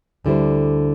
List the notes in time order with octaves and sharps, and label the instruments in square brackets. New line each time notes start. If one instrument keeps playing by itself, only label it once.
[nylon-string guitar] D2 D3 G3 E4 C5